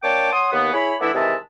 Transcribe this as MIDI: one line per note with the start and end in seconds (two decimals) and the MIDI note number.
0.03 0.29 58
0.03 0.29 62
0.03 0.29 73
0.03 0.29 79
0.03 0.29 81
0.03 0.29 86
0.31 0.48 73
0.31 0.48 78
0.31 0.48 84
0.31 0.48 87
0.52 0.73 39
0.52 0.73 59
0.73 0.94 64
0.73 0.94 68
0.73 0.94 73
0.73 0.94 83
1.00 1.09 52
1.00 1.09 57
1.00 1.09 59
1.00 1.09 62
1.00 1.09 64
1.14 1.35 48
1.14 1.35 51
1.14 1.35 52
1.14 1.35 56
1.14 1.35 76
1.14 1.35 81